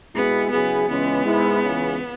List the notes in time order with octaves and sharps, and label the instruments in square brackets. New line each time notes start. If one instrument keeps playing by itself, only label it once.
[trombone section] B2 G#3 E4 G#4 [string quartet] B3
[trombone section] C#3 F#3 E4 G#4 [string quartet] B3
[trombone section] C#2 C#3 E3 G#3 C#4 [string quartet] B3
[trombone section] G#2 G#3 E4
C#2 C#3 E3